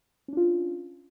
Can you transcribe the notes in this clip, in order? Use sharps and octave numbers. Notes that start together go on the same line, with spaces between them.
C#4 D4 F4